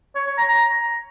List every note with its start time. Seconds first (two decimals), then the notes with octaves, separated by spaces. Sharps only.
0.16 C#5
0.27 C#5
0.37 A#5
0.48 A#5